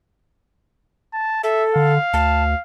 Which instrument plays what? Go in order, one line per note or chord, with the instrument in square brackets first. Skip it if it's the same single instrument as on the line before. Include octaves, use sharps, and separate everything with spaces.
[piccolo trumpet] A5
[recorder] A4 [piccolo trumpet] E5
[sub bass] D3 [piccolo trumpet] F5
[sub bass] D2 [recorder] A5